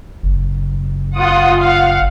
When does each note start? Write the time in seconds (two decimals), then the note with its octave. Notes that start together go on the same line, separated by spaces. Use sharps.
0.23 F#1
1.16 F4 F#5 D#6
1.59 F5 F#5